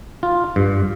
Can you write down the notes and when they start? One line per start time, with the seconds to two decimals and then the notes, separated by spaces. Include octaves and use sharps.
0.23 F4
0.56 G2